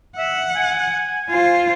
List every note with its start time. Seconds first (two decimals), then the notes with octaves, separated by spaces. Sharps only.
0.18 E5 F#5
0.56 G#5
1.30 F4 C5